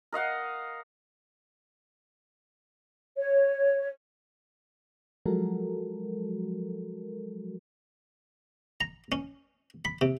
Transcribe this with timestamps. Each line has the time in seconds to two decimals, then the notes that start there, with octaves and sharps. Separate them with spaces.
0.13 A#4 D#5 F5 F#5
3.16 C#5
5.26 F3 F#3 G#3 F#4 A4 A#4
8.81 A#5
9.12 C#4
9.85 B5
10.01 C3